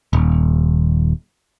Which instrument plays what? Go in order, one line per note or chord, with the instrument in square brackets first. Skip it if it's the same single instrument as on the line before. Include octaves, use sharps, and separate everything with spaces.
[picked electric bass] D#1